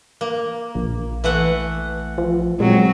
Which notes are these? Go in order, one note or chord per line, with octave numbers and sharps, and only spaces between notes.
A#3
A#1
E3 A3 F#5
F3
A#2 F#3 G#3 C4